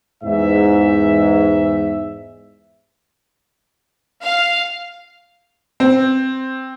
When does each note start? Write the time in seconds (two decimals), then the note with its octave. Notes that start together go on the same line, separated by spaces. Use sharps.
0.24 E2 G#2 E5
4.22 F5
5.80 C4